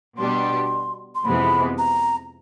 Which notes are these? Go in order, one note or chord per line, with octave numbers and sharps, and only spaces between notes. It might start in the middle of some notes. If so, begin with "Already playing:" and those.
B2 G3 B3 D4 G4 C6
C6
F2 C3 E3 G#3 B3 B5
A#5